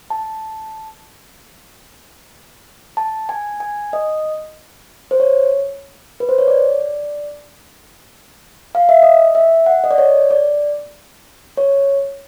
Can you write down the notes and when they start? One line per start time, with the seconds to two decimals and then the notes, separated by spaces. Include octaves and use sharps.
0.10 A5
2.97 A5
3.29 G#5
3.60 G#5
3.93 D#5
5.11 C5
5.20 C#5
6.20 B4
6.29 C5
6.38 C#5
6.48 D5
8.75 F5
8.89 E5
9.02 D#5
9.35 E5
9.66 F#5
9.84 D#5
9.91 D5
9.98 C#5
10.31 D5
11.57 C#5